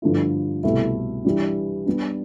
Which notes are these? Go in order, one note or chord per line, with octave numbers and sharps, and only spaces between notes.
G2 D3 F3 A3 E4
C2 B2 A3 E4
E3 G3 D4
G3 B3 D4